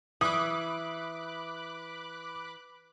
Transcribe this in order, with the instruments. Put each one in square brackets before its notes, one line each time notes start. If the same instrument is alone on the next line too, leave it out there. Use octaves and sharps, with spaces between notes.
[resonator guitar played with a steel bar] E3 [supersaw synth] B5 D6 F#6 [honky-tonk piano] D#6